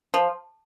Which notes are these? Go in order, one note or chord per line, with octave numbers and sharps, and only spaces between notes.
F3